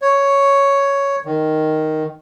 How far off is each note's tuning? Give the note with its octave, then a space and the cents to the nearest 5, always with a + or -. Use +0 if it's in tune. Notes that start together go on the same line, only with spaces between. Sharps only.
C#5 +5
D#3 +0